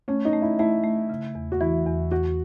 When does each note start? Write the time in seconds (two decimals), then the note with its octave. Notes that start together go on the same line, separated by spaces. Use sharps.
0.08 A3 C#4
0.25 D#4
0.33 A3
0.42 E4
0.59 A3 E4
0.84 A3
1.10 C#3
1.35 E2
1.52 F#4
1.61 E3 E4
1.87 E2
2.11 E2 F#4